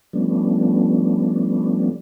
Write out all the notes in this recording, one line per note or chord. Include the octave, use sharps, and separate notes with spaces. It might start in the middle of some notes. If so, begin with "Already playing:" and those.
F3 G3 A3 B3 C#4 D4